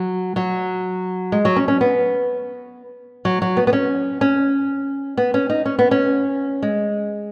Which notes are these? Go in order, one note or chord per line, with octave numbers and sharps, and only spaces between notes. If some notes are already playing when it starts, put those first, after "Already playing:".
Already playing: F#3
F#3
G#3
F#3
C#4
C#4
B3
F#3
F#3
B3
B3
C#4
C#4
B3
C#4
D#4
C#4
B3
C#4
G#3